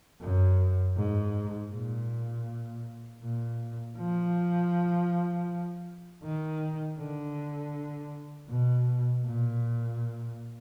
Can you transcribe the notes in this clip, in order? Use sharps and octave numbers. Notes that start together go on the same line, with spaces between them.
F#2
G#2
A#2
A#2
F3
D#3
D3
B2
A#2